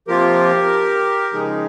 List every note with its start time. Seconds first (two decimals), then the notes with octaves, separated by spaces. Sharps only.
0.08 C3 F3 A#3 F4 G4 A#4
1.33 C#3 F3 G#3 D#4 G#4